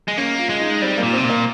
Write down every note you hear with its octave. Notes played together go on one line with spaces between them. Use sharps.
G#3
A#3 C#4
F4
G#3
D#4
G3 C4
A#3
A#2
C3 C4
A#2
A#3